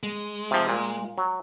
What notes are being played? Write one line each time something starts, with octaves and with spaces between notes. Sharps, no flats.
G#3
C3 F3
A#2
F#3